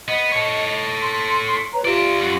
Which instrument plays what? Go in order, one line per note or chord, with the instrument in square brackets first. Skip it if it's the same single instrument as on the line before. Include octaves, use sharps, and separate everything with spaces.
[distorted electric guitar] B3 [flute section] D#5
[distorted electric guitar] A4 C#5
[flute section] C6
B4 C#5 A#5
[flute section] F4 G4 [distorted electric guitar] D5 E5
[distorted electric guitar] F#2 F#4